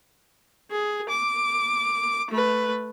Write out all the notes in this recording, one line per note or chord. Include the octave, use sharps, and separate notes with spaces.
G#4
D6
A3 B4